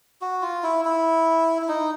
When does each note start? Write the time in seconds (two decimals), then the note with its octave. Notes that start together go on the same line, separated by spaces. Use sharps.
0.21 F#4
0.42 F4
0.63 E4
0.85 E4
1.62 E4
1.68 D#4